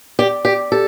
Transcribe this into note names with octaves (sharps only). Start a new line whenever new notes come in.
G4 D5
G4 D5
G4 A4